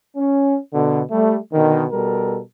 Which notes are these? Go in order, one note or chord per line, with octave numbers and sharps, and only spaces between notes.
C#4
B2 D3
G3 A3
B2 D3 D#3
B2 G3 A4 A#4